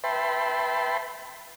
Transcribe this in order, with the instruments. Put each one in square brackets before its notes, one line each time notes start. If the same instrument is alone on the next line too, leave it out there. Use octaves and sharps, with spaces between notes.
[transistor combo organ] B4 E5 G5 A5 B5 C6